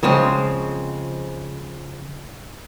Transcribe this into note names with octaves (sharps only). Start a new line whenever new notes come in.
C#3 F3 G#3 C4